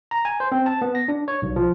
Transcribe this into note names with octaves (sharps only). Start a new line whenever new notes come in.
A#5
G#5
C5
C4
A5
B3
A#6
D4
C#5
B1
F3